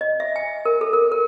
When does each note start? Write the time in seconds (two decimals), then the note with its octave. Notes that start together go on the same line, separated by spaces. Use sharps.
0.01 D#5
0.20 E5
0.36 G#5
0.65 A#4
0.81 A4
0.93 A#4
1.12 A#4